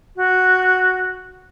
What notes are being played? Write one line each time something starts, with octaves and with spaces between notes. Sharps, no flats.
F#4